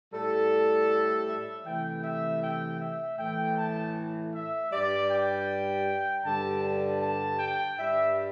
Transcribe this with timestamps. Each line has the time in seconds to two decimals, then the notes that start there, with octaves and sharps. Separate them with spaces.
0.13 A2 G3 A4
1.28 E5
1.66 C3 E3 A3 G5
2.04 E5
2.43 G5
2.80 E5
3.19 A2 E3 A3 G5
3.58 A5
4.34 E5
4.72 G2 G3 D5
5.10 G5
6.24 G2 D3 G3 A5
6.63 A5
7.02 A5
7.39 G5
7.77 G2 G3 E5